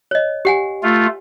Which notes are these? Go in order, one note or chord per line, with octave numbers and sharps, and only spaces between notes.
C#5 D#5
G4 F#5 G#5
A3 F4